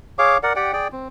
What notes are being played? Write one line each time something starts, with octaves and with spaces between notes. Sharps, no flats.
G#4 C#5 F5 D6
A#4 D5 F#5
G4 D5 F#5 G5
G#4 D5 G5
C4